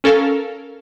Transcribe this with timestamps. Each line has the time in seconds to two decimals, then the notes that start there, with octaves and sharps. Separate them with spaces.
0.04 C#4 A4 A#4 F5